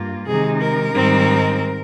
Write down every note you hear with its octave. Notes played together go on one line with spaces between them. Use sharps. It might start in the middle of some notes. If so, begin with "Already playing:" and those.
Already playing: G2 A#3 F4
C3 D#3 G#3 D#4 G#4
A#4
G#2 D#3 G3 C4 D#4